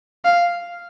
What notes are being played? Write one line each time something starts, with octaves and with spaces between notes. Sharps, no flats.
F5